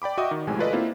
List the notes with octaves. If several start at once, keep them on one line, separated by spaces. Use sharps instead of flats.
D5 G5 B5 D6
F#4 D#5 E5 G5 D6 D#6
D#3
A#1 A2 C3 G#3 G#5
F4 A4 B4 D5 D#5
A#3 C4 E4 F4